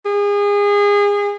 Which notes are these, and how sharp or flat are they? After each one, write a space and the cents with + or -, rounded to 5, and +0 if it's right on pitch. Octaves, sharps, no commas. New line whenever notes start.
G#4 -30